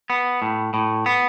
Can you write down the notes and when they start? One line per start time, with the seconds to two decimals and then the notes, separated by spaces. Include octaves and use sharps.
0.10 B3
0.42 A2
0.74 A2
1.06 B3